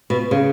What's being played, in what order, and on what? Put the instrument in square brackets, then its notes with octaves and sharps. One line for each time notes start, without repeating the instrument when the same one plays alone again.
[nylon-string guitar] B2
C#3